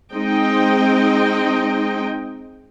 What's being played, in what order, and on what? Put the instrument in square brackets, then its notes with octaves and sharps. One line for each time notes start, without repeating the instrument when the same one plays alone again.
[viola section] G#3 C4 D#4 D#5 G5